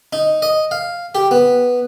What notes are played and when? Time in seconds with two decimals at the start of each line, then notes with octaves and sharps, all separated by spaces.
0.13 D#4
0.42 D#5
0.71 F5
1.15 G4
1.31 B3